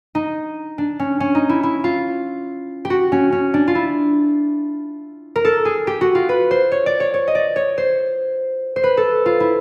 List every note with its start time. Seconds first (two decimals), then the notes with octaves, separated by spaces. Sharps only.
0.15 D#4
0.78 D4
0.99 C#4
1.20 C#4
1.35 D#4
1.49 E4
1.63 E4
1.84 F4
2.85 G4
2.90 F#4
3.12 C#4
3.32 C#4
3.54 D4
3.68 F4
3.75 E4
5.36 A#4
5.45 A4
5.65 G#4
5.87 G4
6.01 F#4
6.15 F4
6.29 B4
6.51 C5
6.72 C#5
6.86 D5
7.00 C#5
7.14 C#5
7.27 D#5
7.35 D5
7.56 C#5
7.78 C5
8.76 C5
8.84 B4
8.97 A4
9.26 F4
9.40 E4